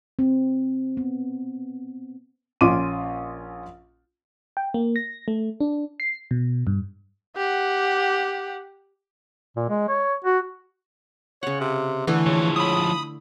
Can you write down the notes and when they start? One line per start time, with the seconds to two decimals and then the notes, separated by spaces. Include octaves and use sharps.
0.19 C4
0.97 B3
2.61 A#1 C#4 F4 D6 D#7
4.57 G5
4.74 A#3
4.96 A#6
5.28 A3
5.60 D4
6.00 C7
6.31 B2
6.67 G2
7.37 G4 F#5
9.56 A#2
9.69 G#3
9.88 C#5
10.24 F#4
11.43 C#3 C#5 F#5
11.61 C3
12.07 D3 E3 A3 B3 E4
12.26 C#3 F3 C#5
12.56 B5 D#6